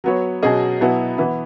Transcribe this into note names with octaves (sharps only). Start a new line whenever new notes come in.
F#3 B3 F#4 C#5
B2 F#3 C#4 G#4 D#5
B2 F#3 B3 E4
E3 B3 E4